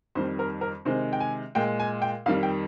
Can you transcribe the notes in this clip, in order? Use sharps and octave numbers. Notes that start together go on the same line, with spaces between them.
F2 D#3 G3 C5
A#4
A#4
C3 D#3 G#3 C5
G5
G#5
A#2 G#3 G5
G#5
G5
F2 D#3 G3 F5
G5